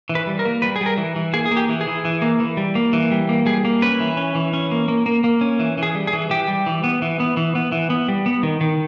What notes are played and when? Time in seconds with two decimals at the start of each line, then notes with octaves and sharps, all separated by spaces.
0.09 E3
0.15 B4
0.27 G3
0.39 A#4
0.45 A#3
0.62 G3 B4
0.76 G#4
0.81 G3
0.86 A#4
0.98 E3
1.16 E3
1.33 A#3 G#4
1.46 G#4
1.51 A#3
1.57 G4
1.69 E3
1.81 G#4
1.87 E3
2.05 E3
2.22 A#3
2.40 E3
2.57 G3
2.75 A#3
2.93 E3
3.11 G3
3.29 A#3
3.46 G3 G#4
3.65 A#3
3.82 C#4 B4
4.00 E3
4.17 C#4
4.35 E3
4.53 C#4
4.71 A#3
4.88 A#3
5.06 A#3
5.24 A#3
5.41 C#4
5.59 E3
5.78 E3 G#4
5.95 G3
6.07 G#4
6.13 E3
6.30 E3 G4
6.48 G3
6.66 E3
6.84 B3
7.02 E3
7.20 B3
7.37 E3
7.55 B3
7.72 E3
7.90 B3
8.08 G3
8.26 B3
8.43 D#3
8.61 D#3